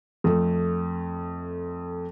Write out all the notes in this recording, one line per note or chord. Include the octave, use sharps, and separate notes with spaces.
F2 A3